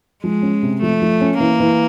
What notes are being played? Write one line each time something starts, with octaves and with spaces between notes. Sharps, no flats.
F3 G#3
C#4
C3
F3 A3
F3
C#4
E3 A#3
E3